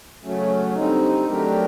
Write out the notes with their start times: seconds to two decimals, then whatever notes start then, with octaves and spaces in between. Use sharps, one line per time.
0.23 C#3 F#3 A3 C#4
0.74 D3 G3 C4 D#4
1.24 F#3 A3 D4 G4 A#4